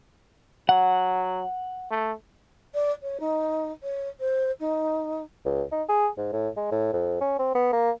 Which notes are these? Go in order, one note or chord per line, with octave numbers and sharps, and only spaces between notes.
F#3 F#5
A3
D5
C#5
D#4
C#5
C5
D#4
C#2
D#4
G#4
G#2
A2
G#3
A2
F2
C#4
C4
B3
A#3